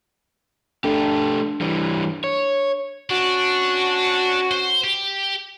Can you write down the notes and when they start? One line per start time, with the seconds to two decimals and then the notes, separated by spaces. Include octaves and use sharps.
0.84 A3 D4 G4 A4
1.61 E3 G3
2.24 C#5
3.10 C#4 D4 F#4
4.51 C5
4.84 G4